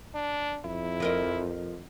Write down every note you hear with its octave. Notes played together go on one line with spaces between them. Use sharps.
D4
F2 E4
F3 A#4 D#5